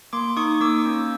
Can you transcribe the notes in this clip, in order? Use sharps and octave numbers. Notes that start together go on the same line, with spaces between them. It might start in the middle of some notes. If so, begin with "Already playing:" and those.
A#3 C6 D6
D#4 C#6 D#6
A#3 D6 E6
C#4